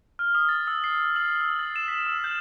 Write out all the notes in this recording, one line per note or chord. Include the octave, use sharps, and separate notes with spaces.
F6
D#6
A6
E6
C7
F#7
E6
A6
E7
B6
E6
G6